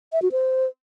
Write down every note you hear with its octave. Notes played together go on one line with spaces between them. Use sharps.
E5
F#4
C5